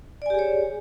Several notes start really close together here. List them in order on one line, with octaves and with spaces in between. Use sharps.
D5 G#5 G4 G#4 C#5